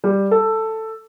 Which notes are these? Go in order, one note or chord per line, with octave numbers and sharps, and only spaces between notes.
G3
A4